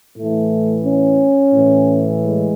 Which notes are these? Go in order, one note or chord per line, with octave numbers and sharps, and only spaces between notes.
A2 E3 A3
C#4
A2 E3
G#3